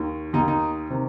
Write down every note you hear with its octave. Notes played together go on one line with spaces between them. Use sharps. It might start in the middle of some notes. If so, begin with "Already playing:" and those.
Already playing: D#2 D#3
D#2 D#3 D#4
D#4
C3 D#3